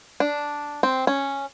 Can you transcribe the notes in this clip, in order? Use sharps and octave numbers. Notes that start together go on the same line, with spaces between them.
D4
C4
C#4